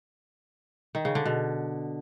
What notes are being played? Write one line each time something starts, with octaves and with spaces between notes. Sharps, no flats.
D#3
C#3
D3
B2